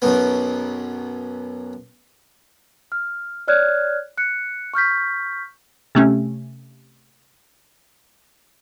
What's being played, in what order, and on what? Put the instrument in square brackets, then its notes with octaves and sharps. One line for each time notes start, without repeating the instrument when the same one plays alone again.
[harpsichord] B1 F#2 B3
[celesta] F6
C#5 D5 F6 F#6 G#6
F#6 C#7
C#6 F6 G6 B6
[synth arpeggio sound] C3 A3 C#4